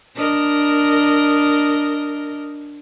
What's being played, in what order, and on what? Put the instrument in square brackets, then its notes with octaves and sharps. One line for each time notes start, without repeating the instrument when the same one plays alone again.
[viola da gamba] D4 A#4 D#5